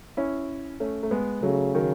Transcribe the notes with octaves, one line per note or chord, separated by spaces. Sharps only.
C#4 E4
A3 C#4
A3
G#3 B3
C#3 F#3 A3
D#3 F#3